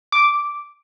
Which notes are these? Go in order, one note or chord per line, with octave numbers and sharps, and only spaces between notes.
D6